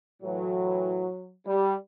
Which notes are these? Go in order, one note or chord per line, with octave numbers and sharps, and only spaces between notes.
A2 E3 F#3
G3